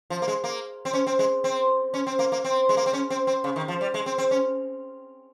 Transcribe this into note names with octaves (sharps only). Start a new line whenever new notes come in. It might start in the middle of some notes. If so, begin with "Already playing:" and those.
F3
A#3
G#3
A#3
C4
C#4
C4
G#3
C4
C#4
C4
A#3
A#3
C4
G#3
A#3
C4
C#4
C4
C4
C#3
D#3
F3
G3
G#3
C4
C4
C#4